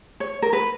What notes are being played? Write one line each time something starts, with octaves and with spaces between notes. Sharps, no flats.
C#5
A#4
B4